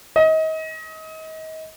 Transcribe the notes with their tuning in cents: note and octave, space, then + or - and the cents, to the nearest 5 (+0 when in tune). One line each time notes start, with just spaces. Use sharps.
D#5 +30